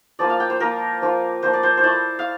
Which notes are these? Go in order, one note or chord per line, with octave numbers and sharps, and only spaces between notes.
F3 A#3 F4 D5
F5
G5
C5
F3 A#3 F4 A#4
F3 A#3 F4
F3 A#3 F4 C5
D5
C5
C5
A3 E4 D5
F5